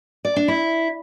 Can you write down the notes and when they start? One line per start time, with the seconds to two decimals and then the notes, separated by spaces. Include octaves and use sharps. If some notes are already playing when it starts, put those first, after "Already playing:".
0.25 D5
0.36 D4
0.48 E4